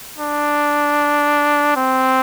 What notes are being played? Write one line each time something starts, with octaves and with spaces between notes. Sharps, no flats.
D4
C4